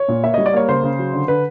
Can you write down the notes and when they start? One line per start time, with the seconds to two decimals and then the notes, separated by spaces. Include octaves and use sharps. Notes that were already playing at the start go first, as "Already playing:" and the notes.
Already playing: C#5
0.08 A#2
0.23 A#3 E5
0.34 G3 D#5
0.46 D5
0.54 A#3 C#5
0.68 C#3 C5
0.83 C#3
0.99 F#3
1.13 D3
1.28 D3 B4